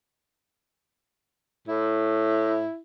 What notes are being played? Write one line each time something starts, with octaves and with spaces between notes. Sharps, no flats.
A2 E4